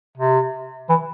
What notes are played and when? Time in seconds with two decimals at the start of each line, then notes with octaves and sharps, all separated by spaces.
0.17 C3
0.89 E3